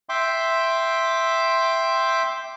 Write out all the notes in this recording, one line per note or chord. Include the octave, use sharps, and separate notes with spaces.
E5 G5 C6 D6